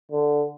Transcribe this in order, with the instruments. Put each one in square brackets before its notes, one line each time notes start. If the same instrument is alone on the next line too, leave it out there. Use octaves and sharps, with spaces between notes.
[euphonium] D3